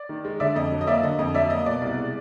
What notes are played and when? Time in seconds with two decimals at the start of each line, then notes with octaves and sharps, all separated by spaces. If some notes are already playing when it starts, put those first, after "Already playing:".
Already playing: D5
0.09 D#3
0.25 G#3
0.40 D3 D5 E5
0.55 F2 D#5
0.72 F#3
0.81 D#5
0.87 A#3 D5 E5
1.03 D3 D#5
1.19 F2 D#5
1.34 F#3 D5 E5
1.50 A#3 D#5
1.66 B2 D5
1.82 C2
1.97 G#3